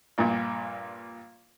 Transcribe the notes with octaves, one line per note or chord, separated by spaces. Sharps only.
A#1 G2 A#2